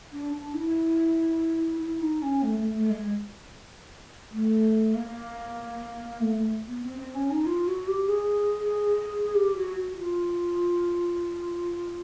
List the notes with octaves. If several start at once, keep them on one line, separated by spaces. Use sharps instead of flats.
D4
D4
E4
E4
D#4
C#4
A3
A3
A3
G#3
A3
A#3
A3
A3
B3
C4
C4
C#4
D#4
F4
F#4
G4
G#4
G4
F#4
F#4
F4